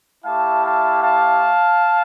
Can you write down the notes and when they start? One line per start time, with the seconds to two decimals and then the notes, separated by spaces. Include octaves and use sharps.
0.25 A3 E4 G4 F5 A5
0.64 F5 A5
1.03 F5 A5